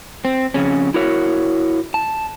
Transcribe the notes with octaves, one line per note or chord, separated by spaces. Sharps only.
C4
F2 C#3 C#4
E4 F#4 A#4 C#5
A5